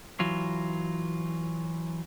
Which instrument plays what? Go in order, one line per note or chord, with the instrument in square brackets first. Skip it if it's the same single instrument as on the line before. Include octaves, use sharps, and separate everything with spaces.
[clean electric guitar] E3 F#3 F4